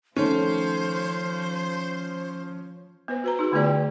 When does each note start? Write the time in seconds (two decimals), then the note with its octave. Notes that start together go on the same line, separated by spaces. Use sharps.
0.16 D#3 F3 A3 C#4 C5
3.08 B3 B4 C5
3.24 F#4 B4 A#5
3.39 D#4 F#4 G#4
3.52 D3 A3 B3 F4 G#4 D5
3.64 G5